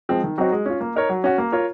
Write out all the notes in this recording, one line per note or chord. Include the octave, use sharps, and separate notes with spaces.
F3 G#3 C4
D#3
F#3 C4 D#4 F#4
G#3
C#4 F4
A#3
D#4 A#4 C#5
F#3
C#4 F#4
A#3
F4 A#4 C#5